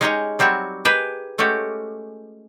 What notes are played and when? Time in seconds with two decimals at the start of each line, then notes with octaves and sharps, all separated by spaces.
0.01 G#3 C#4 D#4 G4 C#5 D#5
0.39 F#3 G3 C4 F#4 C#5
0.85 G4 G#4 A#4 B4 D#5 G5
1.38 G#3 A3 C#4 F#4 G4